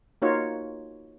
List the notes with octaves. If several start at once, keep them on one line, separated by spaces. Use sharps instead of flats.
A#3 D#4 F4 F#4 C#5